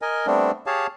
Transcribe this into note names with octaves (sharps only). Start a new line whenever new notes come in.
A#4 D#5 G#5
G3 A3 B3 C4 D4
G4 G#4 C#5 F5 A5